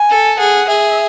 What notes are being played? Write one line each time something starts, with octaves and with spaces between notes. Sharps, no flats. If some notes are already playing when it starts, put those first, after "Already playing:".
Already playing: G#5
A4
G#4 F#5
G#4 E5